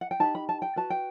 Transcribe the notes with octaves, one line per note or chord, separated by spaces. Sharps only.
F#5
G5
D#4 G4 B4 A5
B5
A5
G5
F#4 B4 A5
G5